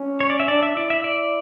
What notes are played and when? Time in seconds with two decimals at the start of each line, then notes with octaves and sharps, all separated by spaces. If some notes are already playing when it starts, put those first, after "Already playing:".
Already playing: C#4
0.20 C#5
0.30 D5
0.40 E5
0.48 D4 D5
0.63 E5
0.76 E4 D5
0.90 E5
1.04 D5